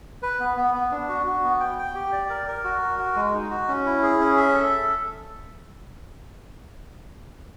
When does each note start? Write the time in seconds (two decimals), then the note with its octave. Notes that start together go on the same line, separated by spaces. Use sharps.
0.23 B4
0.40 B3
0.57 B3
0.74 B3
0.91 D4
1.09 F#4
1.26 F#4
1.44 B3
1.60 G5
1.78 G5
1.95 G4
2.12 D5
2.30 A#4
2.48 A#4
2.64 F#4
2.82 A#4
2.99 F#4
3.16 G#3
3.34 D#4
3.51 F#4
3.68 C#4
3.86 E4
4.02 G#4
4.20 C#4
4.37 E5
4.54 A4